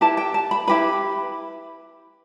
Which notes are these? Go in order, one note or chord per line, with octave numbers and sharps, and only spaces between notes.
E4 G4 B4 A5
G5
A5
B5
E4 G4 B4 B5